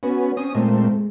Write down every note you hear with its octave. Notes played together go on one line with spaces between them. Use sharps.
B3 C#4 F#4
C4 C#4 D#6
A#2 G#3 A3 C4